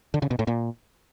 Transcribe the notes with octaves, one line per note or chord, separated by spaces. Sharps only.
D3
C#3
B2
A2
A#2